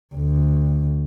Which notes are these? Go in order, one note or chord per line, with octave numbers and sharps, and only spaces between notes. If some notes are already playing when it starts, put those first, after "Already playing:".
D2